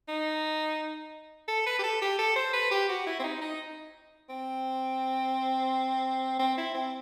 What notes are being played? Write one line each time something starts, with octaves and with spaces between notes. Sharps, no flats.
D#4
A4
B4
G4
A4
G4
A4
C5
B4
G4
F#4
E4
C4
D#4
D#4
C4
C4
E4
C4